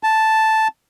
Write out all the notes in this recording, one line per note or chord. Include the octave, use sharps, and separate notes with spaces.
A5